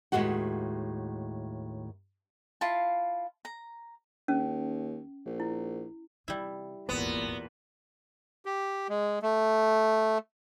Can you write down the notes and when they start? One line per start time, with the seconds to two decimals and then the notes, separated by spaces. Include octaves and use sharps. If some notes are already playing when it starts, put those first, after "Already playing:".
0.12 D#2 A2 F3 G#3 F#4 F#5
2.61 E4 F4 F5 A5
3.45 A#5
4.28 D#2 C#4
5.25 A#1
5.40 E4
6.28 C3 G3 E4
6.89 D#1 G#1 E2 A#2 B3
8.45 G4
8.89 G#3
9.22 A3